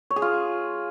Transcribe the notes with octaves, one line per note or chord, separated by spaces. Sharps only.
C#5
G#4
F4